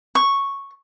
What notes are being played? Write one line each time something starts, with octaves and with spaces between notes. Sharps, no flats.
C#6